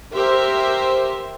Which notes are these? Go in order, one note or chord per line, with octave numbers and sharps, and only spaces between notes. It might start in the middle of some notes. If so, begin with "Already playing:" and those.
G4 A#4 C5 E5